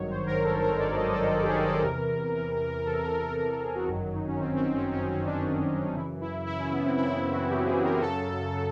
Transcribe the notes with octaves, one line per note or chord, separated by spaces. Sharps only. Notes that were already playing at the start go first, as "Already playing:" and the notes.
Already playing: G#1 G2 D#3 F#3 C#5
C5
G#1 G2 D#3 F#3 A#4
A4
A#4
G#1 G2 D#3 F#3 D5
D#5
A4
G#1 G2 D#3 F#3
G4
G#4
A4
E2 C3 E3 A#4
E2 C3 E3
E2 C3 E3 A4
A4
E2 C3 E3 A#4
A4
G#4
F#4
G1 F#2 D#3 F#3
D#4
C#4
G1 F#2 D#3 F#3 C4
C4
C#4
G1 F#2 D#3 F#3 C#4
C4
D4
G1 F#2 D#3 F#3 D4
F#2 C#3 E3 E4
E4
F#2 C#3 E3 E4
C#4
B3
C4
F#2 C#3 E3 E4
F#4
F#2 C#3 E3 G4
G#4
A#4
F#2 C#3 F#3 A4
C#3 F#3